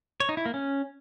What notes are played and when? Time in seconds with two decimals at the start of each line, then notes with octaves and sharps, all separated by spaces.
0.20 C#5
0.29 D#4
0.37 E4
0.46 A#3
0.54 C#4